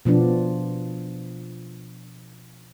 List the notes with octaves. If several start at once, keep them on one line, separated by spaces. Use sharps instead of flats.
B2 F3 B3 D4